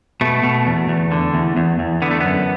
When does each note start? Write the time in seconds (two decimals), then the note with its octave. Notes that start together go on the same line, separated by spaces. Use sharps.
0.21 B2 A3
0.43 B2
0.67 E2
0.88 E2
1.11 D3
1.34 E2
1.57 E2
1.79 E2
2.02 D3 B3
2.11 A3
2.20 F#2 B3